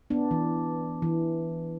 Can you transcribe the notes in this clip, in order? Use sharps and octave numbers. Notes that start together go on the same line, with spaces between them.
B3 D4
E3
E3